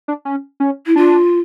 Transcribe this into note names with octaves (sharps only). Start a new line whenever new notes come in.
D4
C#4
C#4
E4
D4 F4